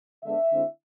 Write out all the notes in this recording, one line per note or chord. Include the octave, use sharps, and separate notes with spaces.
D3 G#3 B3 D4 E5
D3 G#3 C4 E4